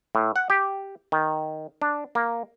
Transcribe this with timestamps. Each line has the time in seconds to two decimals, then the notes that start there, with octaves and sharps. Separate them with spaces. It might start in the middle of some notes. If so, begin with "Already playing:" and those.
0.15 A2
0.36 F#5
0.50 G4
1.12 D#3
1.82 D4
2.15 A#3